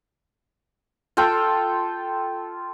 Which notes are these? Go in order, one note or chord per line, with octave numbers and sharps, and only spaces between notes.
F4 A4 G5